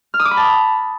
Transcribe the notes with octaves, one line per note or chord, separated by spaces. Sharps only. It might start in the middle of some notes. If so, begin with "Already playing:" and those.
F6
D#6
D6
B5
A5